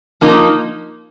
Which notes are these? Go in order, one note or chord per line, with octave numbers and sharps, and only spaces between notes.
F3 A#3 D#4